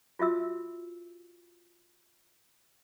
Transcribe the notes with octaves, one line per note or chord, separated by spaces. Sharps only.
F4 F#4 E5 E6